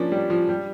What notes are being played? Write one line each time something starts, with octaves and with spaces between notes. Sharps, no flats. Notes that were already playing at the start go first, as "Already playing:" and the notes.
Already playing: F3 A#3 C#4 D4
G3
F3
G3